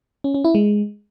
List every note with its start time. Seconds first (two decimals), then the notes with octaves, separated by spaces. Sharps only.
0.24 C#4
0.34 C#4
0.44 E4
0.55 G#3